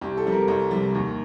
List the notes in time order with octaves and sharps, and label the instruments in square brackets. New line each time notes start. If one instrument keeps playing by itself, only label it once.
[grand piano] C2 G4
A4
C3 G3
A#4
C2
C3 G3
D#2